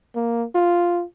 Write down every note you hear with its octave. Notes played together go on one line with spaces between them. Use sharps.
A#3
F4